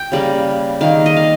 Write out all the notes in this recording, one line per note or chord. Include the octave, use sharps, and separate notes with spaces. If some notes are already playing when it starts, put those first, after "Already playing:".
Already playing: G5
C#3 G3 A#3
D#3 A#3 F5
D#5
F5